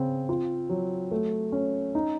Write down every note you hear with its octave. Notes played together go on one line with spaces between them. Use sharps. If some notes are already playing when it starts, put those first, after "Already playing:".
Already playing: C#3 C4
F4
F#3
A3
C#4
D#4